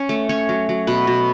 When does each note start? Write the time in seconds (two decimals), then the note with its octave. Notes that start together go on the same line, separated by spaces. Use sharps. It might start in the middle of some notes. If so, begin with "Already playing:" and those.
Already playing: C#4
0.09 A3
0.29 C#4 C#5
0.49 F#3
0.69 F#3
0.87 B2 B4
1.07 B2